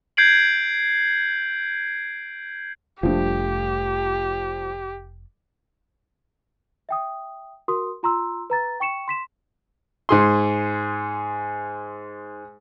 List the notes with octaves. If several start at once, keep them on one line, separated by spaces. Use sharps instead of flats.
G6 G#6 C7 D7 F#7
F1 A2 F3 G3 A3 D4 G4
E5 G5 D#6
F#4 A#4 C6 D#6
F4 A#5 C6 E6
B4 A#5 A6
G5 C#6 C#7 E7
C6 B6 E7
G#2 G#4 C6